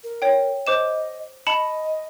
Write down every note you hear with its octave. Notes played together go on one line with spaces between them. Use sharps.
A#4
C#5 G5
C5 D#5 D6 E7
D#5 A5 B5 C#7